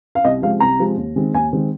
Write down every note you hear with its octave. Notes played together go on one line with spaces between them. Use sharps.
F5
C2 D#5
C3 F3 G#3 F5
C2 A#5
C3 F3 G#3
D#2
D#3 G#3 C4
D#2 G#5
D#3 G#3 C4